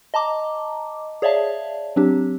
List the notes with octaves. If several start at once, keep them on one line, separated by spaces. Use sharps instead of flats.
D#5 A5 A#5 D6
G#4 C#5 D5 E5 F5 A5
F#3 C4 D4 G4